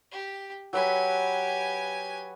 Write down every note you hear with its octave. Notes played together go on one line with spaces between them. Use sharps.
G4
F#3 G4 B4 G#5